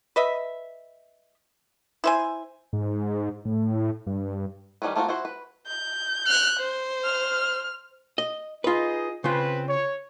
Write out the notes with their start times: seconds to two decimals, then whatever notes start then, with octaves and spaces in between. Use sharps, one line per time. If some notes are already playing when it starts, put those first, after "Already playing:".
0.16 B4 D#5 E5
2.04 E4 C5 G#5
2.73 G#2
3.45 A2
4.07 G2
4.82 D#3 G3 A3 C#4 B4
4.96 A3 A#3 C4 F4 F#4
5.08 E4 F#4 C5
5.25 B4
5.68 G6
6.27 F6 F#6
6.59 C5
7.05 F6
8.18 D#5
8.64 D#4 F4 G#4 B4 D#5
9.24 C#3 C4 F4 B4
9.68 C#5